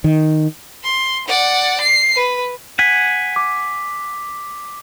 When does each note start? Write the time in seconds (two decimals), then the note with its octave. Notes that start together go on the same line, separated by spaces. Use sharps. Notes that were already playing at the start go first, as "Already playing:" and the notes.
0.04 D#3
0.83 C6
1.27 D5 F#5
1.81 C7
2.16 B4
2.79 F#5 G#5 B6
3.36 D6